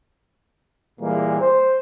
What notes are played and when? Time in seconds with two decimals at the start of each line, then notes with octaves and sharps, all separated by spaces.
1.00 A#2 E3 G3 G#3 A#3
1.41 C5